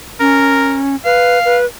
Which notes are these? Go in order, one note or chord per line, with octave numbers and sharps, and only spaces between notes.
C#4 A#4
B4 F5
B4